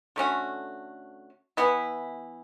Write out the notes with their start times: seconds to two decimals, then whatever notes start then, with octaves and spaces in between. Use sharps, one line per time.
0.16 D3 A3 C#4 F#4
1.57 E3 B3 E4